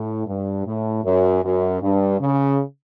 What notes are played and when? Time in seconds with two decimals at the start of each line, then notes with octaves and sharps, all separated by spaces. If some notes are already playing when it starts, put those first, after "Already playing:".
Already playing: A2
0.27 G2
0.65 A2
1.03 F#2
1.43 F#2
1.82 G2
2.20 C#3